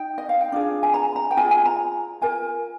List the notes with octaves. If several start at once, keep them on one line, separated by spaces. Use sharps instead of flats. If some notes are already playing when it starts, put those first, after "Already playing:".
Already playing: D#4 G5
D#5
F5
G5
D4 F4 G#4
G#5
A#5
A#5
G5
F4 G#4 G#5
G#5
A#5
F4 A#4 G#5